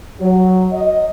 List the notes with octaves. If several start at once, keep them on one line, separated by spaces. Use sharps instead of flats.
F#3
D#5